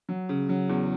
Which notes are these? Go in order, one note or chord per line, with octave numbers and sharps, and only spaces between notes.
F#3
C#3
F#3
E2